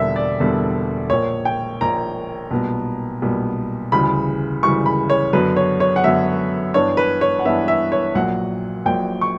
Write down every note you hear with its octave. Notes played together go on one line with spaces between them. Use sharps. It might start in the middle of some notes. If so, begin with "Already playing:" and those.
Already playing: E1 E2 D3 G3 A#3 E5
D5
E1 E2 D3 G3 A#3
A#1 A#2 A#3 C#5
G5
A#1 A#2 A#3 A#5
B1 A#2 G3 B3
B1 A#2 G3 B3
D2 C#3 E3 G3 B5
D2 C#3 E3 G3 C#6
B5
C#5
F#2 D3 F#3 B3 B4
C#5
C#5
F#5
F#2 D3 F#3 B3 E5
G2 E3 B3 D4 C#5
B4
C#5
F#5
G2 E3 B3 D4 E5
E5
C#5
A#1 A#2 F#3 F#5
A#1 A#2 F#3 G5
C#6